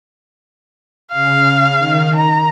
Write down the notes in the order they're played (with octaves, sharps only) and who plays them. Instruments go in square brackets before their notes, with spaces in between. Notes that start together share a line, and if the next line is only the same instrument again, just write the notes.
[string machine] C#3 [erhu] F5
[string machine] D#3
[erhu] A#5